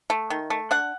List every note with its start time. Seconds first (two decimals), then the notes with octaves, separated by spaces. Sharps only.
0.10 A3
0.30 D#3
0.50 A3
0.71 D4 F#5